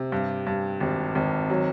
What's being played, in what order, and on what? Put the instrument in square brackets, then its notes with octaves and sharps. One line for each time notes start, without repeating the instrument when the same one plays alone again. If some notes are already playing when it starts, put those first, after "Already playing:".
Already playing: [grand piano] C3
G2
G2
G#1
G#1
F#3